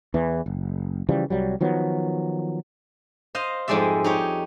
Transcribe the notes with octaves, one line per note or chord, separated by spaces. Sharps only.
E2 E3
F#1
C#3 E3 F3 G3
C2 F#3 G3
D#3 F3 F#3 B3
C5 D#5 F5
F2 G#2 G3 G#3 D5 E5
D#4 G4 C#5